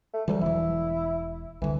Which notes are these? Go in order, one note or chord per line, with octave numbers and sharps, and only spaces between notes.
A3
D2 E3 F#3 G3
E1 E3 E4
C2 D3 E3